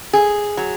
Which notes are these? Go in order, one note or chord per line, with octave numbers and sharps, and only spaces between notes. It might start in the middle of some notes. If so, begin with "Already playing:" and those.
G#4
F#3